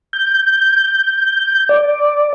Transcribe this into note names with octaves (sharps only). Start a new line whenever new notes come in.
G6
D5